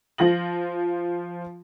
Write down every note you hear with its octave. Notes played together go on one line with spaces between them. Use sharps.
F3 F4 A#6 F#7